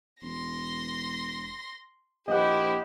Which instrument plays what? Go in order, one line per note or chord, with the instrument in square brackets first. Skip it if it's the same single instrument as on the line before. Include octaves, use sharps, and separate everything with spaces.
[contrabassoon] E1 [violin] C6 A#6
[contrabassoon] A#1 [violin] E4 C5 [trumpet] G4 [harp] D#5 F#5